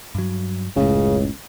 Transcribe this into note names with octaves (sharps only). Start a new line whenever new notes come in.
G2 F#3
F#1 C#2 A2 C#3